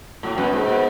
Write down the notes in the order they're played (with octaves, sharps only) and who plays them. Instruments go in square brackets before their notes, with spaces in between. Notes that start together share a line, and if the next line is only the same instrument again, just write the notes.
[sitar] A2 [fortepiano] F#3
[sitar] F#2 [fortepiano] B3 F#4 B4
[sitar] G#2 [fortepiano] F#3
[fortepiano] B3 F#4 B4